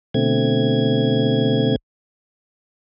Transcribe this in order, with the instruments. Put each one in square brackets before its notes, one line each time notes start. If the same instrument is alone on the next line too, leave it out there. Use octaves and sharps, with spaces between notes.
[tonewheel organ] B2 D3 A3 C4 G#6